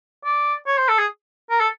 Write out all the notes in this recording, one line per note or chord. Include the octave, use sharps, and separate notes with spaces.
D5
C#5
C5
A4
G#4
A#4
A4